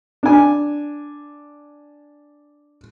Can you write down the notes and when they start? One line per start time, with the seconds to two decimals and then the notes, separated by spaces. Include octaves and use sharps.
0.23 D4 G#5